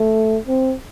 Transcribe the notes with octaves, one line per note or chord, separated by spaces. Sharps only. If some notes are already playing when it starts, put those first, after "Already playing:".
Already playing: A3
C4